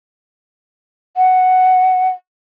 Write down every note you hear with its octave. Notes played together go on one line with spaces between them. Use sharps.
F#5